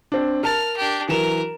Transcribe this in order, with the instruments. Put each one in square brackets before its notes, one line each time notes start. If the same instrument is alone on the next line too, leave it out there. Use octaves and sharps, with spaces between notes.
[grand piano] C4 D4
[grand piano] A#4 A5 A6 [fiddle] F6
[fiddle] D4 G4
[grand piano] E3 F#3 E7 [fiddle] A#4